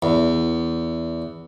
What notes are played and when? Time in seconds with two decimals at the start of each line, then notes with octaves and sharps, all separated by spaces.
0.02 E2